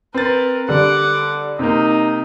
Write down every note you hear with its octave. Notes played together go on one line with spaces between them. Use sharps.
C4 A#4 B4 A6
D3 G3 F#5 D6
C3 A#3 D#4